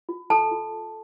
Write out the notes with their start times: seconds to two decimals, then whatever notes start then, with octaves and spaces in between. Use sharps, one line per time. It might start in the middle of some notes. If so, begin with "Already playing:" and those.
0.09 F4
0.30 A4 A5
0.51 F4